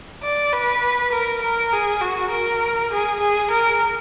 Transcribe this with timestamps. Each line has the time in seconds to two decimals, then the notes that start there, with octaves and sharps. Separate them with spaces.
0.23 D5
0.52 B4
1.12 A#4
1.42 A#4
1.72 G#4
2.01 F#4
2.31 A#4
2.91 G#4
3.20 G#4
3.50 A#4